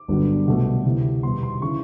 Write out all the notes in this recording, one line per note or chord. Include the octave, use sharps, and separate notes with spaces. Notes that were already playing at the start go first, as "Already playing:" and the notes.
Already playing: D6
G1 G2 D3 F#3 B3
C2 B2 F#3 A3
D2 C3 E3
E2 B2 G3 B3 C6
C6
C#3 E3 C#6